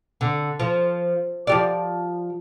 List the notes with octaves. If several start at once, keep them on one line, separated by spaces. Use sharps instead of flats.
D3
F3
F3 G4 D5